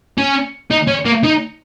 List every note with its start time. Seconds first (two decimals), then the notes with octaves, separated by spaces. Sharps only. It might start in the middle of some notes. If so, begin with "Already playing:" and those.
0.18 C#4
0.71 D#4
0.88 C#4
1.05 A#3
1.23 D#4